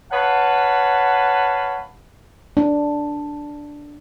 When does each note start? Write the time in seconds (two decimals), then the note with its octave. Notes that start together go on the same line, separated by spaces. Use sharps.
0.11 B4 C#5 F5 F#5 A5
2.57 D4